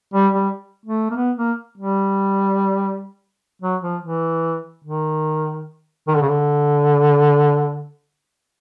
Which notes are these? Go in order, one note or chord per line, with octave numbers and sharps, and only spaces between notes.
G3
G3
A3
A#3
B3
A#3
G3
F#3
F3
E3
D#3
D#3
D3
C#3
D3